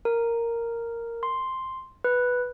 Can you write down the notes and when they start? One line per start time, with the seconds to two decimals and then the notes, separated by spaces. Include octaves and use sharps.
0.05 A#4
1.23 C6
2.04 B4